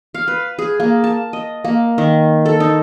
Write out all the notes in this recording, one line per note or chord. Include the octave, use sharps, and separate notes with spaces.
F5
B4
G#4
A#3
A5
D#5
A#3
D#3
A4
D#4